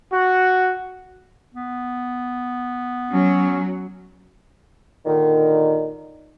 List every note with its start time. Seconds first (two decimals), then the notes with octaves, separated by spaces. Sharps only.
0.12 F#4
1.54 B3
3.11 F#3 C#4
5.06 A#2 D3 D#3